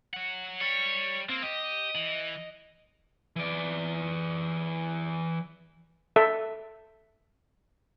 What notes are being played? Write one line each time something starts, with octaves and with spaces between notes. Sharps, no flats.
C#5 F#5
G3 C#5
A#3 C4
G4 D#5
E3
E3 D5
A4 E5